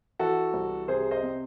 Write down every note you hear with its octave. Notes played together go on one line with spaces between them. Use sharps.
E3 F#4 A4
C2
C3 G#4 C5
C5 D#5
C4